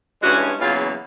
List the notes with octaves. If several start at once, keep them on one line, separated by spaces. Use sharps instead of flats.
G2 E3 G#3 C#4 F#4
E2 C#3 F#3 A#3 F4